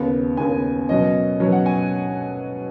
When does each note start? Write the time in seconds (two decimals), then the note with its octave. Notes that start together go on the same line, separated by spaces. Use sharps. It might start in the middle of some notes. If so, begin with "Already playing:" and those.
Already playing: D#2 C#3 B3
0.37 D#2 C#3 B3 G#5
0.89 B2 F#3 C#4 D#5
1.40 B2 F#3 C#4 C#5
1.52 F#5
1.66 G#5